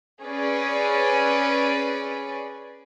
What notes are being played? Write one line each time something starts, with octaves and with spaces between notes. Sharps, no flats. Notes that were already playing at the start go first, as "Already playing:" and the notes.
C#4 G#4 B4 D5